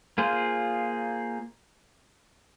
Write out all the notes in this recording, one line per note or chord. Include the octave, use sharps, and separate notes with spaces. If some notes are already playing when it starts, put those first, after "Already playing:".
A#3 F4 G#4 C5